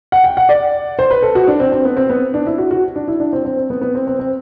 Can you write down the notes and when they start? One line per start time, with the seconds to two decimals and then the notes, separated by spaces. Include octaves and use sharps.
0.12 F#5
0.24 G5
0.37 F#5
0.49 D5
0.99 C5
1.11 B4
1.23 A4
1.35 F#4
1.48 D4
1.60 C4
1.72 C4
1.85 B3
1.97 C4
2.10 B3
2.34 D4
2.46 E4
2.58 F#4
2.71 F#4
2.96 D4
3.08 E4
3.20 D4
3.33 C4
3.45 C4
3.57 C4
3.70 B3
3.81 B3
3.95 C4
4.07 C4
4.19 C4